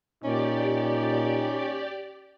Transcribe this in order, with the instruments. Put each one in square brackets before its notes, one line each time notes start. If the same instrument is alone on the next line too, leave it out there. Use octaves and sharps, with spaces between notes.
[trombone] A#2 [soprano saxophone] C#4 [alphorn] D#4 [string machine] G4 D5